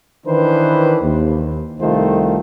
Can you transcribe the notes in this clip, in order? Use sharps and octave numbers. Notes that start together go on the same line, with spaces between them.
D#3 E3 D4 B4 C5
D#2
C2 D#3 A3 F4 C5